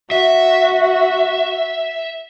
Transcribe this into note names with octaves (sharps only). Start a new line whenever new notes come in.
F#4 E5